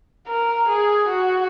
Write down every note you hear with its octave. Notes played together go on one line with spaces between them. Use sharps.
A#4
G#4
F#4